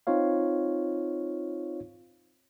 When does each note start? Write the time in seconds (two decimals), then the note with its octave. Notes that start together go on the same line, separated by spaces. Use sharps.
0.07 C4 D#4 F4 C#5 F5